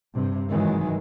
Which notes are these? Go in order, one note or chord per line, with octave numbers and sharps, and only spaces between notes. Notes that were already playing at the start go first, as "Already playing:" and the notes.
G2 C3
G#2 D#3 E3 F#3 G#3